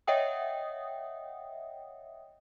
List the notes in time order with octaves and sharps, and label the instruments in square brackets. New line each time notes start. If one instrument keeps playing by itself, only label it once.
[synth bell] C#5 D#5 E5 F#5 G5 D#6